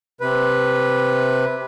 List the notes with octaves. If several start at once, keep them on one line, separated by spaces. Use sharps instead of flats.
C3 B4